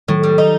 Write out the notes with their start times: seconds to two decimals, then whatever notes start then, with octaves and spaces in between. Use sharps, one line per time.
0.08 A2 D#3 F#3
0.23 G3
0.38 D#4